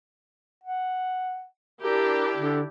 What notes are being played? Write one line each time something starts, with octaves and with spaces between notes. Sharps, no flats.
F#5
D4 E4 G4 A#4
D3